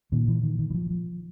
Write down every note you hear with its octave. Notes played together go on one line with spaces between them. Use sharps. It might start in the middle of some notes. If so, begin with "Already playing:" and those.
A#2 D#3
E3
D#3
D#3
E3
F3
F3